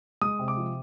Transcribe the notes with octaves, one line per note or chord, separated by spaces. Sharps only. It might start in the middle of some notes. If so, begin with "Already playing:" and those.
G#3 D#6
C3
D6
F3